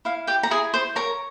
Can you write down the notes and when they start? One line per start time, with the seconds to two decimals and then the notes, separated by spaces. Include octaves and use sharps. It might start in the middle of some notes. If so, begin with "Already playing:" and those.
0.05 E4 F5
0.27 G4 G5
0.43 A#5
0.51 E4 G#4 G#5
0.74 C5 C6
0.95 A#4 C#5 A#5